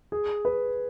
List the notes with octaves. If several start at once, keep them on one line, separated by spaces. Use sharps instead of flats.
G#4
B4